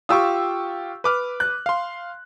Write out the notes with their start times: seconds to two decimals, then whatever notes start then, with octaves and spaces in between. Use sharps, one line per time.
0.09 F4 G4 C#6 D#6 E6
1.04 B4 D6 F6
1.40 F#6
1.66 F5 C6